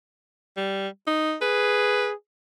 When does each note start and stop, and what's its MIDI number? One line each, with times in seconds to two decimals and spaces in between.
0.57 0.88 55
1.07 1.36 63
1.42 2.14 68
1.42 2.09 71